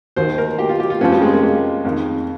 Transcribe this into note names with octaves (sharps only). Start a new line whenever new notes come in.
D#2 D#3 C5
A#4
G4
F4
G4
F4
F2 C#3 F3 C#4
G3
G#3
A#3
G#3
F2 D#3